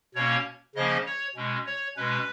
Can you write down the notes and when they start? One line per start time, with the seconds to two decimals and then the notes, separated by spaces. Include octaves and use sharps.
0.15 B2 A#3 C#4 C#5
0.75 C#3 F3 A#3 C#4 D#5
1.06 C#5
1.36 B2 G#3 C#4
1.66 C#5
1.97 B2 G#3 C#4 B4